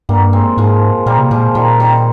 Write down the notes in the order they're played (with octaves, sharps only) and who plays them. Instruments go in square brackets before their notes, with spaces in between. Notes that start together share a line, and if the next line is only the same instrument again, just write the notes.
[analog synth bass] G2 [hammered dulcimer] G3 A#3
[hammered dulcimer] G#3 C4
[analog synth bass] G#2 [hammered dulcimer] F3 G#3
[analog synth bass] A#2 [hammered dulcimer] G3 A#3
[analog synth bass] C3
[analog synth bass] A#2 [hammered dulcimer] F3 G#3
[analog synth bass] A#2 [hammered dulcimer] D#3 G3
[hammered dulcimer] D#3 G3